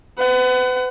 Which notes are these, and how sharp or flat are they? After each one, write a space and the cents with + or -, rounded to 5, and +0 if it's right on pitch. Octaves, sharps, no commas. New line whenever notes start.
B4 +40 F#5 +25